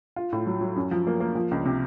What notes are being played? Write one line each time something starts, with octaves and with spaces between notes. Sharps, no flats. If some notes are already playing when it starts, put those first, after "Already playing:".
F4
A2
F#3
F#3
F#2
F3
A#3
A#3
F3
C#2
C3